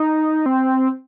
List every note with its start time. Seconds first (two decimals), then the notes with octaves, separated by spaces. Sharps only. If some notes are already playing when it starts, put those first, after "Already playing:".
Already playing: D#4
0.46 C4